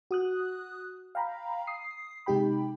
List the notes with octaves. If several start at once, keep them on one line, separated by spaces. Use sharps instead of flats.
F#4 D#6 F#6
F5 G5 A#5 B5
D#6 C7
C3 G#3 D#4 G4 G5 B5